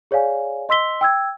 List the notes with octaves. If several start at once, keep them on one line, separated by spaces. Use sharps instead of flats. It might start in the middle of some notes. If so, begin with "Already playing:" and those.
G#4 C#5 D5 F5 G#5
D#5 C6 E6 B6 G7
G5 E6 G#6